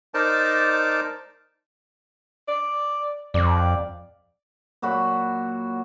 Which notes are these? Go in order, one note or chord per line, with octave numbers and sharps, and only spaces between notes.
D#4 A#4 C5 D5 A5 D6
D5
F2 D5
A#2 F#3 F#4 B5